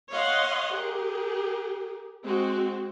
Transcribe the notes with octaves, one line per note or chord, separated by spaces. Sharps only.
C#5 D#5 F5 F#5 C6
G4 G#4 A#4
G#3 C4 F#4